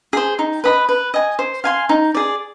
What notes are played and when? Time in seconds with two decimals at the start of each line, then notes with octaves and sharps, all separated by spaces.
0.13 G#4 C5
0.39 D#4
0.64 B4 D#5 B5
0.89 B4
1.14 D#5 G#5
1.39 C5
1.64 F5 G#5 C6
1.89 D#4
2.15 G#4 D5